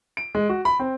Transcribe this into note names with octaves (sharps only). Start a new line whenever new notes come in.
D7
G#3
F#4
B5
C4